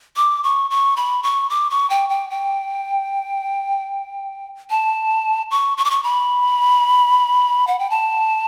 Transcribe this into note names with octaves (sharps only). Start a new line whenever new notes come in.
D6
C#6
C#6
B5
C#6
D6
C#6
G5
G5
G5
A5
C#6
C#6
D6
C#6
B5
F#5
G5
A5